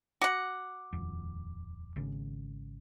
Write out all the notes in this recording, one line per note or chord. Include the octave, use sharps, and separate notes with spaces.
F#4 F#5 D6
D#1 F2
G#1 C#3